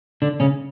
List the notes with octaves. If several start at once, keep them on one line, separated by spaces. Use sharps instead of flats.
D3 D4
C#3 C#4